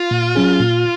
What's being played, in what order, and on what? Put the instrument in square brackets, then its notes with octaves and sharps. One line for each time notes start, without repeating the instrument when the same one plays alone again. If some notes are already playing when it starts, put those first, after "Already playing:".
Already playing: [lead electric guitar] F4
[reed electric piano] A#2
F#3 C#4 G#4
A#2